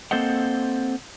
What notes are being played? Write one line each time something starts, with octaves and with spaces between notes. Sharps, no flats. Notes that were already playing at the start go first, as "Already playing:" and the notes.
A#3 C4 A4 C5 D#5 F#5